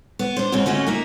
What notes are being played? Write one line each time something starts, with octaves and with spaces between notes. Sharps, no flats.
B3
D4 C5
G#2 C#3 G#3 A#3 C4 F#4
D2 A3 C#4 F4 F#4 D#5
A#3 D#4 E5